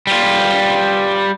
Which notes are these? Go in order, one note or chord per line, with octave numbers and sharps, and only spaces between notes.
G3 F4